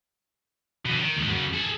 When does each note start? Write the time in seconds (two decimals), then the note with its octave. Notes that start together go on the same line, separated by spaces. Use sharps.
0.86 B2 D3
1.00 D#3
1.17 D#2 G#3
1.29 F#2 C#3
1.54 G#4 A4